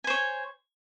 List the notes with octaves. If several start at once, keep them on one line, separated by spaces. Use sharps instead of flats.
C5 C#5 G#5